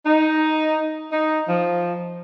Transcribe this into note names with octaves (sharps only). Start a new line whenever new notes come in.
D#4
D#4
F3